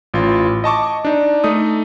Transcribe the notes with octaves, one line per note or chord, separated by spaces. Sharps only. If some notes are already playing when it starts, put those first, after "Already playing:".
A1 F4
D#5 A5 C#6 D6
D4 D#4
A3 D#4 D#6